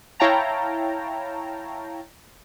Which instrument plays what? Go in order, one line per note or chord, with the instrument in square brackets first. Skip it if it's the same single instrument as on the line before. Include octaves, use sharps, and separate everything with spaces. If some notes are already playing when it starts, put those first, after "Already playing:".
[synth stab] E4 C#5 F5 G5 A5 A#5